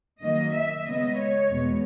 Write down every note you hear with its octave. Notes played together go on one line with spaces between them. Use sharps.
F#2 D#3 F#3 A#3 D#5
E5
C#3 G#3 B3 D#5
C#5
E2 B2 G#3 B3